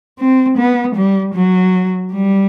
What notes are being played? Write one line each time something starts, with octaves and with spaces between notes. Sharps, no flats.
C4
B3
G3
F#3
G3